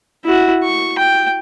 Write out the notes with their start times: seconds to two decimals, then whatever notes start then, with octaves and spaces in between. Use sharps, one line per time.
0.24 E4 F#4
0.64 C#6
0.99 G5